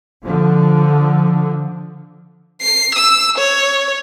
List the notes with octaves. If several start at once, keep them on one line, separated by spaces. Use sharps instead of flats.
D3 F3
C7
E6
C#5